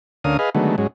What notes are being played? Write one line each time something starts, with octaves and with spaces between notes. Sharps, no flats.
D2 D3 C#4 A#4 F5 D#6
G#4 B4 D#5 F5
D3 D#3 F#3 G#3 A3 B3
G#2 F#3 G#3 C#4